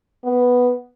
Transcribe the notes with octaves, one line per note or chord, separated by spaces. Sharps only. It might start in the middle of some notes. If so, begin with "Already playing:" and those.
B3